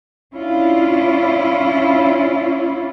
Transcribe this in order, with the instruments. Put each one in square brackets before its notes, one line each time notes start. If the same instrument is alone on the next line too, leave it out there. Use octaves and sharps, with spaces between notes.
[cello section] C#4 D4 E4 F4